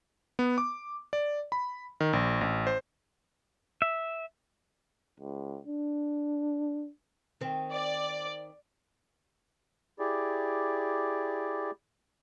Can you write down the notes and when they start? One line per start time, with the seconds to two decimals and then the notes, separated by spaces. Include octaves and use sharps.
0.39 B3
0.58 D6
1.13 D5
1.52 B5
2.00 D#3
2.13 A#1
2.41 A1
2.67 C5
3.82 E5
5.20 C#2
5.67 D4
7.41 D#3 C4
7.71 D5
9.99 E4 G4 G#4 D5